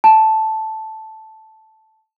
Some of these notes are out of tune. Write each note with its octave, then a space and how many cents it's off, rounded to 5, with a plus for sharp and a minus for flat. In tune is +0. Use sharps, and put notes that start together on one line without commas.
A5 -5